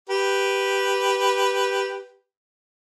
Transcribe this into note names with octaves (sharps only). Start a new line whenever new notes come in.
G4 B4